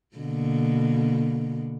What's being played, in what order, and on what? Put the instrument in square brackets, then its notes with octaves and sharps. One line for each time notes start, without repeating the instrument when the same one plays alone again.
[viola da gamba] B2 D3 A#3